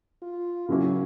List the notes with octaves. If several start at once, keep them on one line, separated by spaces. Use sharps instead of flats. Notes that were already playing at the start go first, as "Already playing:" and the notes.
F4
C#3 F#3 A#3 C#4 E4 F#4